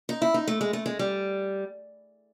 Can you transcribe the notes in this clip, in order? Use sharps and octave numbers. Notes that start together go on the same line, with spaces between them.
D#4
E4
D#4
A3
G#3
A3
G#3
G3